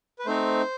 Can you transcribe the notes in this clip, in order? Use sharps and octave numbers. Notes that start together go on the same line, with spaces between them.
B4
A3 C4 D#4 C5